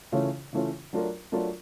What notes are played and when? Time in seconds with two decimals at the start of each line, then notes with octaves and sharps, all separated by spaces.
0.12 C#3 E3 A3 C#4 F4
0.53 C#3 E3 A3 C#4 F4
0.93 F#3 A3 D4 F4 A#4
1.32 F#3 A3 D4 F4 A#4